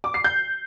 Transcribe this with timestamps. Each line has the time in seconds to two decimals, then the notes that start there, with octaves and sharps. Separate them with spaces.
0.04 D6
0.14 C7
0.24 G6